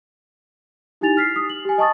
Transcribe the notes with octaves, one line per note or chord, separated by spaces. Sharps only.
D#4 E4 G4 G#5 A6 F7
F6 B6 C7
D#6
F#7
G4 G#5
D#5 A5 C#6 D#6 A6